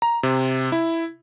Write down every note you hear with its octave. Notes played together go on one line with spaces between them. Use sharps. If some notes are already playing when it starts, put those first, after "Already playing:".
A#5
C3
E4